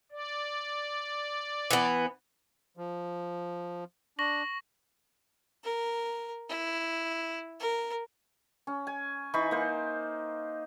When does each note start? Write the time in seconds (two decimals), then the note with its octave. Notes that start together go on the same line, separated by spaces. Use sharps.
0.12 D5
1.71 E3 B3
2.77 F3
4.19 D4 C#6 A#6 F#7
5.64 A#4
6.49 E4
7.60 A#4
8.67 C#4
8.87 G#5
9.34 E3 D#4 B5 C#6
9.51 A#3 C5